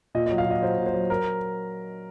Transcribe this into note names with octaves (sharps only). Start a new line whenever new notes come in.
A#2 D#5
F#3 D#5
F5
A#2 D#5
F#3 C5
A#2
C5
F#3
A#4